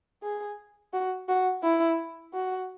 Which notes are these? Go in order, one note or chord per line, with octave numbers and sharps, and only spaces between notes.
G#4
F#4
F#4
E4
F#4